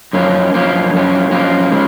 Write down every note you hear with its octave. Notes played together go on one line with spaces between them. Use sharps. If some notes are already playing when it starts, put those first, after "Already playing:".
F#2 F3 A#3 C#4
F#2 F3 A#3 C#4
F#2 F3 A#3 C#4
F#2 F3 A#3 C#4
C#3 F3 G#3 C#4